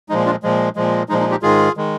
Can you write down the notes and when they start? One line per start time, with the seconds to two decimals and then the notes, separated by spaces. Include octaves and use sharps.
0.09 A#2 F3 G#3 D#4
0.26 D4 F4
0.43 A#2 F3 G#3
0.76 A#2 F3 G#3
1.09 A#2 F3 G#3 D#4
1.20 D#4
1.31 D#4 G4
1.42 G#2 D#3 G#3 F4 G#4
1.77 D#3 G#3